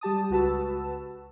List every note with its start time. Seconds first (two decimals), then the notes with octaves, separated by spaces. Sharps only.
0.01 G3 G4 A5 D#6
0.30 C#2 F#4 B4 A5 E6